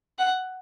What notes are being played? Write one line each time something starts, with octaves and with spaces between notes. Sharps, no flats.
F#5